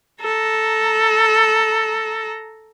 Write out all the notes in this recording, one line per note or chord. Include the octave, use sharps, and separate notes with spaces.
A4 A#5